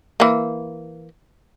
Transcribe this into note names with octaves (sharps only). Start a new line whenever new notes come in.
E3 A#3